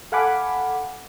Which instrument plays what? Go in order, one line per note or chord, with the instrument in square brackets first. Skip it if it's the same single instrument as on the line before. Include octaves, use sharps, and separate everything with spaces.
[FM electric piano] A4 F5 F#5 G#5 B5 D6